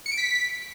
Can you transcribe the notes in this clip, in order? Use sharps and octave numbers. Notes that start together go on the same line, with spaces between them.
C#7
D7
B6